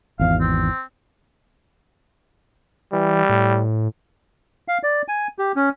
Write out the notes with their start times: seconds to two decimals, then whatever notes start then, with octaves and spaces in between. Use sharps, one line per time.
0.19 G#1 E2 F5
0.41 C4
2.93 E3 G3
3.29 A2
4.68 F5
4.83 D5
5.08 G#5
5.39 G4
5.56 C#4